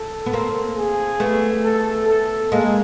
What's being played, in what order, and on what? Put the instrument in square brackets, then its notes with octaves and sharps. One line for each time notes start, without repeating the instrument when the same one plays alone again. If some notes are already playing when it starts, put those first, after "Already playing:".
Already playing: [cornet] A4
[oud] B3
A#3 C4
[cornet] G#4
[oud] A3 B3
[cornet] A4
A4
[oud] G#3 A#3 [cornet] G#4